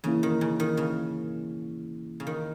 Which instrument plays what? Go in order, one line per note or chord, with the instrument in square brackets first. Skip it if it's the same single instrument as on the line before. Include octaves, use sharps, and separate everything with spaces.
[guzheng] C#3 [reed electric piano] E3 A#3 C#4 E4
[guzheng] D#3
C#3
D#3
C#3
C#3
D#3